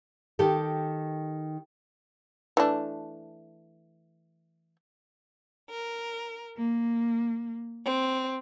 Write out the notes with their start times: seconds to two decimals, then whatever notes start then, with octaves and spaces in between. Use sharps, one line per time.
0.39 D#3 G4 A4
2.57 E3 A3 D4
5.69 A#4
6.57 A#3
7.85 C4